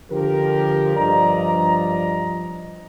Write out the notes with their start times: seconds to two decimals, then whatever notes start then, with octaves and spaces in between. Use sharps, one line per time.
0.11 D3 F3 G4 A#4
0.97 G2 F3 D5 D#5 A#5